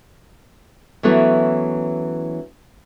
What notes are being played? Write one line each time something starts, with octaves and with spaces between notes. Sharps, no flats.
E3 F#3 A3 B3 C#4 E4